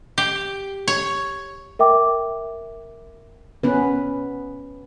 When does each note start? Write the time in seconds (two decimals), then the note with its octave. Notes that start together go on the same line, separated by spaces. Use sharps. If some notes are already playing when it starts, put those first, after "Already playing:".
0.18 G4
0.88 C#5
1.79 A#4 E5 G5 D6
3.63 B3 C#4 B4